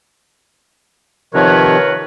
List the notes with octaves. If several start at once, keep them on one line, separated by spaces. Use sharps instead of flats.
C3 D#3 F3 A#4 B4 C#5